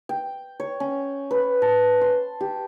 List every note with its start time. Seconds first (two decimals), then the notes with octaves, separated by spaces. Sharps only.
0.09 G5
0.60 C#5
0.80 C#4
1.31 B4
1.62 A5
2.01 C6
2.41 G4